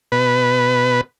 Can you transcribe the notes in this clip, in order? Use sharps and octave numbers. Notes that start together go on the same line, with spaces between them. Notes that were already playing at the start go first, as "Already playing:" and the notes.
B2 B4